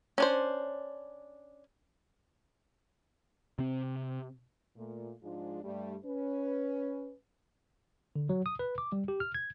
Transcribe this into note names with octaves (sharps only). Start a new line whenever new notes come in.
C#4 D4 C5
C3 C4
A#2 A3
G#2 F3 G#3 D4 F4
G2 G3 A3
C#4 B4
D3
F#3
D#6
B4
D6
G3
G4
F6
G#6